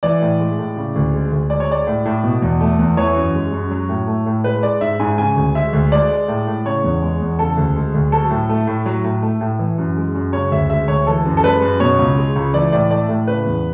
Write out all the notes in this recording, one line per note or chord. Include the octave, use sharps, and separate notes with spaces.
E3 D5
A2
G#3
A2
C#3
D2
G#3
D2
G#3 D5
C#5
G#3 D5
A2
A2
B2
E2
A3
E2
E3 C#5
F#2
G#3
F#2
F#3
A2
A3
A2
G#3 B4
G#3 D5
G#2 E5
G#2 G#5
C#3 G#5
D2
G#3 E5
D2
G#3 D5
G#3
A2
A2
C#3 C#5
E2
G#3
E2
C#3 A4
D2
G#3
D2
F#3 A4
A2
A3
A2
F#3
A2
A3
A2
E3
F#2
G#3
F#2
C#3 C#5
D2 E5
G#3 E5
D2 C#5
E3 A4
F#2
A4
G#3 B4
F#2
B2 C#5
C#2
G#3
C#2
E3 D5
A2 D5
A3 D5
A2
C#3 B4
E2